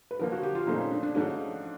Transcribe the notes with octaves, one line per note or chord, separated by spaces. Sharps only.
B4
D3 F3 A#3 A#4
F#4
G4
F4
A#2 F3 A3 C4 D#4
C#4
D4
D4
G#2 F3 A3 C#4 D4 F#4